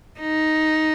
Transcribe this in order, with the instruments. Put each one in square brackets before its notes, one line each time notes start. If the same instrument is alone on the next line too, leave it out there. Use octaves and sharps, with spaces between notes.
[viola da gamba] D#4